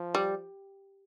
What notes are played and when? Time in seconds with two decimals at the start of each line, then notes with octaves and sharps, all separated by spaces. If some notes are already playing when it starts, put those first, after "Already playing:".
Already playing: F3
0.15 G3